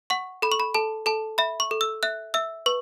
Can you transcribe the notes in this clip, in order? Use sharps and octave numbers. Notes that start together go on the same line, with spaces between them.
F#5 C#6
A4 B5
C#6
B5
A4 A5
A4 A5
E5 B5
C#6
A4
E6
E5 F#6
E5 E6
B4 C#6